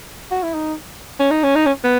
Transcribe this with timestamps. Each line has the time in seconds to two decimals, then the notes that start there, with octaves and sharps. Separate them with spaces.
0.31 F#4
0.43 E4
0.54 D#4
1.19 C#4
1.31 D#4
1.43 C#4
1.55 D#4
1.66 C#4
1.84 B3